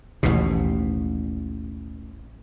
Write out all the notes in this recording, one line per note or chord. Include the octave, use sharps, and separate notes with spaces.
A1 D#2 B2